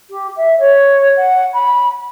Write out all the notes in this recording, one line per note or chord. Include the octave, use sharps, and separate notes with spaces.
G4
E5
C#5
F#5
B5